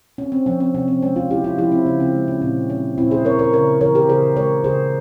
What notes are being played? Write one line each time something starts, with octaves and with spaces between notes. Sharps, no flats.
C4 C#4
C4
F3 C#4
C4
C3 C#4
C4
G#3 C#4
C#4 F4
C4 E4 G4
C#4 F4
F3 E4 G4
C4 E4
C#3 C#4
C4
G#3
C#4
A#2 C4
G#3 C#4
A#2 C4 E4
G#4 C5
C4 A#4 C#5
A#4 C#5
C#3 A#4 C#5
E3 A#4 C#5
G4 A#4
C#3 G#4 C5
G#3 A#4 C#5
C#3 G#4 C5